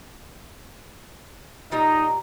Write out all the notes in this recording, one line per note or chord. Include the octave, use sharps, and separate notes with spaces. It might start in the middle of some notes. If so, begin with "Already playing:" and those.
A#2 G3 D#4 D#5 A#5